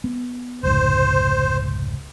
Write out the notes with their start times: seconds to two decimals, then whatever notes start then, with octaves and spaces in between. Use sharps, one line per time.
0.04 B3
0.63 F1 C#2 G#2 C5